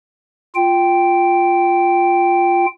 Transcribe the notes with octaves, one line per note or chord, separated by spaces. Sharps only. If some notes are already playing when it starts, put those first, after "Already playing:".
F4 G5